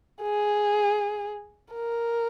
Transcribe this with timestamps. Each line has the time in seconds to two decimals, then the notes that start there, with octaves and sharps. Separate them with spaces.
0.22 G#4
1.73 A#4